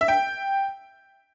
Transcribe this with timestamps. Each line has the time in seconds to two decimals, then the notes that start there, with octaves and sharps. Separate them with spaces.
0.01 E5
0.08 G5